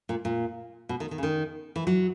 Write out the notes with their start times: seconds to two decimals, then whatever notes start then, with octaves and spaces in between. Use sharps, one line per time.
0.09 A#2
0.25 A#2
0.89 B2
1.00 D#3
1.11 D#3
1.18 C#3
1.23 D#3
1.76 E3
1.87 F#3